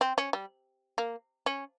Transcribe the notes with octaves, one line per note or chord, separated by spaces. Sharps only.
C4
C#4
G3
A#3
C#4